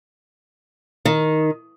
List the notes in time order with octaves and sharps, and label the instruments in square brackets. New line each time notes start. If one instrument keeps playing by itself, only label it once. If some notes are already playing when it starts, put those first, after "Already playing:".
[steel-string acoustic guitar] D#3